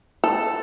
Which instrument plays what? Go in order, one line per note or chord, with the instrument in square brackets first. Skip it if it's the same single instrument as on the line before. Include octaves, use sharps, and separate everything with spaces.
[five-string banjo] A4